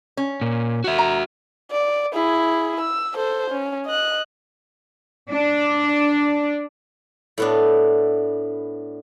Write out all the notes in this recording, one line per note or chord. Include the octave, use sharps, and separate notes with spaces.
C#4
A#2
F#4 E5
A#5
D5
E4 G#4
E6
A4 C5
C#4
D#5 F#6
D4
A2 B3 D4